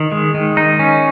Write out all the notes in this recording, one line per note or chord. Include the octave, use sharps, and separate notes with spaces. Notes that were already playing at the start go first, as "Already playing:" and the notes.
Already playing: D#3
G#3
D#3
D#4
C#4